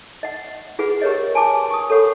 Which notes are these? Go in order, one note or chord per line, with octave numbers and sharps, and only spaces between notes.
D#5 F#5
F4 G#4 B4 F#5
G4 A#4 B4 C#5 D#5
G#5 A5 C6 D6
C#6 D#6
A4 A#4 C#5 F#5 B5